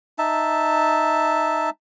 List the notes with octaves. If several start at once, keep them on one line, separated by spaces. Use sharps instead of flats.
D#4 E5 A5